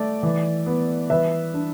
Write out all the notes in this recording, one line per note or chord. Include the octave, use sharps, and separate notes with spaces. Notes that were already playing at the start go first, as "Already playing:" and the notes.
Already playing: A3 D5
E3
B3
E3 B4 E5
D4